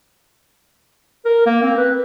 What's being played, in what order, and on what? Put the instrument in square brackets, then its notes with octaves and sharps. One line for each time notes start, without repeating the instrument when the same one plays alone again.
[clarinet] A#4
A#3
C4
B4